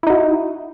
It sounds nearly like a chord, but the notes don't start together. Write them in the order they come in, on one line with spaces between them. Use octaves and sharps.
E4 D#4 F#4